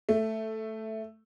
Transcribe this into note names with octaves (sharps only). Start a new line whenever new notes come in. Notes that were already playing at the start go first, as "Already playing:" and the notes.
A3